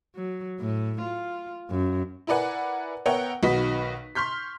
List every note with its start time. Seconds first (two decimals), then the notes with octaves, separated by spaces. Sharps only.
0.15 F#3
0.60 A2
1.01 F4
1.70 F#2
2.27 E4 A#4 B4 D5 F#5 G#5
3.06 B3 A#4 C#5 E5 F#5 G5
3.43 B1 D#3 F#4 B4 D#5 B6
4.15 C6 C#6 F6 G6 B6